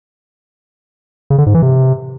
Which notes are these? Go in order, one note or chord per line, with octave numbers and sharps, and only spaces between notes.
C#3
D3
G#2
E3
C3